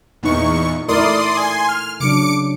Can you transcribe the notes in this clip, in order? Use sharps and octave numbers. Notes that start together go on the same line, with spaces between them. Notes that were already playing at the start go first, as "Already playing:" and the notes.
E2 A#2 D#4 C#6
A3 E4 A#4 D5 C6 D#6
G#5 C6
F6
C#3 F#3 D4 D6 C#7 D7